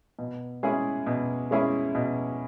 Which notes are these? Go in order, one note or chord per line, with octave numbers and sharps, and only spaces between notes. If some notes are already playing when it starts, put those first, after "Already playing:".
B2
G#3 C#4 E4 G#4
B2
G#3 C#4 E4 G#4
B2